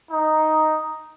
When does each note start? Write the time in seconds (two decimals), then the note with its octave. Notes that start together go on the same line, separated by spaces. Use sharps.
0.11 D#4